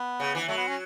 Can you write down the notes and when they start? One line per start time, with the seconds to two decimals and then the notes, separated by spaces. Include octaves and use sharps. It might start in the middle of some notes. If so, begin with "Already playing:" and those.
Already playing: B3
0.20 C#3
0.35 E3
0.48 F#3 A3
0.57 B3
0.68 C#4